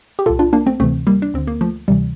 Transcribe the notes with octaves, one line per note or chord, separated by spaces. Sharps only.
G4
C2 A#2 F4 A4
D4 F4
A#3 D4
A3 C4
D2 C3 E3 A3 C4
G3 A#3
D4
D2 D3 C4
A#3
F3 A3
D2 C3 E3 G3